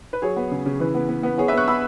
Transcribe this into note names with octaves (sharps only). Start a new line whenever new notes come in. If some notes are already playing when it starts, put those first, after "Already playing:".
B4
F#3 G#4 C#5
B3
C#3
C#3
E3 B4
B3
B3
B3
B3 G#4 C#5
B3 B4 E5
C#6 F#6
B3 B5 E6